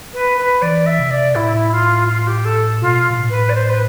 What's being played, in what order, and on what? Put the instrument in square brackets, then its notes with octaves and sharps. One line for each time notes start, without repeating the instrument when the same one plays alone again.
[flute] B4
B4
[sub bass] E3 [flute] D5
[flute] E5
[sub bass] C3
[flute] D5
[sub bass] A2 [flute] E4
[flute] F4
F4
G4
A4
[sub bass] B2 [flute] F4
[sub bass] B2
A2
[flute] B4
D5
C5
B4